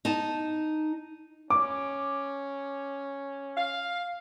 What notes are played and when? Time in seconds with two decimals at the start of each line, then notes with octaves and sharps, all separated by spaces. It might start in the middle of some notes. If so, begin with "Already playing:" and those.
0.05 D#4 A5
1.50 C#4 D6
3.57 F5